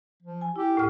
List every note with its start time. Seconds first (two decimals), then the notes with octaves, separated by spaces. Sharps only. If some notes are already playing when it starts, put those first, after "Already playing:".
0.23 F3
0.41 G#5
0.56 E4 G4
0.75 D2 A2 F6